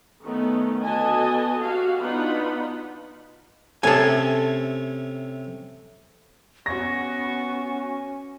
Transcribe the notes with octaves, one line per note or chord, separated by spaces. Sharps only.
D#3 A3 B3 C#4 D#4
D3 B3 F#4 D#5 G#5 A5
F#4 G4 F5
B3 D4 D#4 F4 F#5 B5
C3 A3 C#4 A4 G#5
B3 C#4 F#4 C#6 A#6